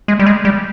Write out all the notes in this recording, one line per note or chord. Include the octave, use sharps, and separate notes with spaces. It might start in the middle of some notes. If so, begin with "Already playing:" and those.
G#3
G3
G#3
G3